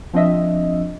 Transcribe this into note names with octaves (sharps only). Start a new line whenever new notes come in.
F3 C4 D4 D#5 E5